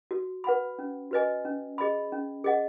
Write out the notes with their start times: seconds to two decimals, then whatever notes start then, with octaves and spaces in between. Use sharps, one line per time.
0.11 F#4
0.44 B4 F#5 B5
0.79 C#4
1.11 F#4 B4 D#5 G#5
1.45 C#4
1.78 G#4 D#5 B5
2.12 C#4
2.44 G#4 D#5 F#5